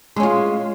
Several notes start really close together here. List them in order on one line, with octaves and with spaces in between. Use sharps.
G#3 C#4 F4